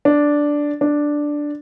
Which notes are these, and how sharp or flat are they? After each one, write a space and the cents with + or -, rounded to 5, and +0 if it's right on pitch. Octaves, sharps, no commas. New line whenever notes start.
D4 -5
D4 +0